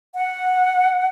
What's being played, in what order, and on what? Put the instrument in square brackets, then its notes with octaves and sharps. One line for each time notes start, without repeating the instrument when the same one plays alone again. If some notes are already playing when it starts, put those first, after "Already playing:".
[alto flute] F#5